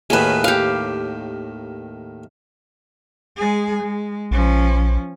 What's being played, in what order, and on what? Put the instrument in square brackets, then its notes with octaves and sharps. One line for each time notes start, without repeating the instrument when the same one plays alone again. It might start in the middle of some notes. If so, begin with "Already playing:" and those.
[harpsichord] D#2 A2 D#3 [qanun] G#4 B4
[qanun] G4 F5
[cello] G#3 G#4
G#3
[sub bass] A#1 [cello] F3 C#4